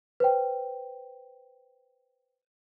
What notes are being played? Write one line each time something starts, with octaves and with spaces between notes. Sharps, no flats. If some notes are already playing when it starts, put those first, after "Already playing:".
B4 C5 G5